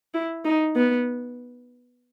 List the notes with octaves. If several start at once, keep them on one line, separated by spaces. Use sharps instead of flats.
E4
D#4
B3